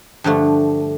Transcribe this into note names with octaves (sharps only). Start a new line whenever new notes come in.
G2 D3 F3 A3